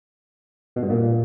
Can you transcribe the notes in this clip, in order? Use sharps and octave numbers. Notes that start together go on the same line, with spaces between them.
B2
G2
A#2